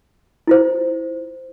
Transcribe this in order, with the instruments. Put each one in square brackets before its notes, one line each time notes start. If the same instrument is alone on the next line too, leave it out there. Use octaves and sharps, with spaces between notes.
[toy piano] E4 F4 C5